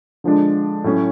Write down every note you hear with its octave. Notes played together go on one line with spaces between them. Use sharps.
D3 F3 G#3 D4
A2 F#3 C#4